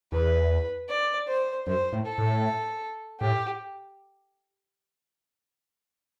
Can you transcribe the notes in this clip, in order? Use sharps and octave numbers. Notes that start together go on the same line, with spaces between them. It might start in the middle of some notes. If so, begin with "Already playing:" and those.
E2 B4
D5
C5
F#2 C5
A2
A4
A2
A2 G4